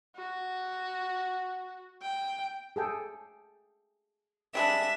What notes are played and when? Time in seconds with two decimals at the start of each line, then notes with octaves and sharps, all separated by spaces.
0.16 F#4
2.01 G5
2.76 G#4 A4 G5
4.55 G3 G#3 D4 E5